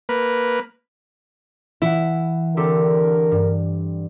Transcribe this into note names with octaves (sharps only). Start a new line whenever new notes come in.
A#3 B4
E3 E4 F#5
D3 C4 G4 A4 A#4
G2